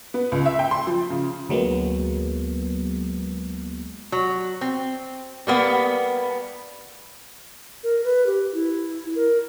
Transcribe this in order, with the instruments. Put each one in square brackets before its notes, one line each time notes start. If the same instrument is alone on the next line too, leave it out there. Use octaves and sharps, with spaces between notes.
[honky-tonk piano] B3
C#2
E5
G5
C6
F3
C#3
[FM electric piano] D2 F#3 G#3 A#3 B3
[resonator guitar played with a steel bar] F#3
C4
G3 A#3 B3
[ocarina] A#4
B4
G4
E4
A#4